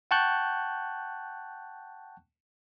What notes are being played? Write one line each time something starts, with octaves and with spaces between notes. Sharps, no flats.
F#5 G5 A5 C#6 F#6 G6